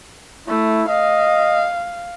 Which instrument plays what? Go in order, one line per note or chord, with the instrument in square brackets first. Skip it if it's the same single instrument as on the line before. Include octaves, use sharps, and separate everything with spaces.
[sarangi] A3 [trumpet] E4
[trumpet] D#5 [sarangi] F5